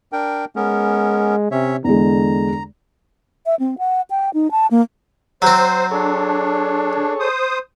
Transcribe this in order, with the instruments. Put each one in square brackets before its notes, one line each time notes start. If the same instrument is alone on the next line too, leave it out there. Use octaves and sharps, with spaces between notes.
[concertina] D4 A#4 G5
[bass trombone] G#3 [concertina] B3 C#4 A#4
[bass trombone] C3 [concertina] C#4 C#5 E5
[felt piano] E2 G#3 [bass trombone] D3 [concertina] A#5
[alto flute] E5
C4
F#5
G5
D#4
A5
A#3
[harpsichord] F#3 C4 [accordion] C5
[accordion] D4 [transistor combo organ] G#4 A4 C#5
[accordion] C5 D#6